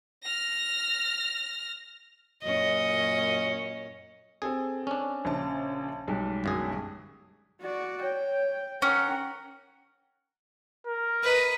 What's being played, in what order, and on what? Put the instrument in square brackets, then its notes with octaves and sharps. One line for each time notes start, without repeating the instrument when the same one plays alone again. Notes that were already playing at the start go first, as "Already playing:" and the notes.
[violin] F6 A#6
[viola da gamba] F#2 A#2 C#4 [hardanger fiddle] D#5
[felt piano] C4 A4 [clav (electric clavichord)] G#4
[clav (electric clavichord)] C#4 D4
[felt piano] A#1 C#3 A5
B1 G3 G#3
[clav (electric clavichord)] G1 F#2 G#4
[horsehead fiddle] F#4 D5
[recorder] C#5 [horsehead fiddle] G5
[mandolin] C#4 [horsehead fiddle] A#4 F#5 [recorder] G5
[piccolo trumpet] A#4
[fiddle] B4 D#5